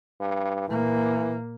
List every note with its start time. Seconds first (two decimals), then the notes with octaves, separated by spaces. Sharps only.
0.20 G2
0.68 A#2 E3 A#3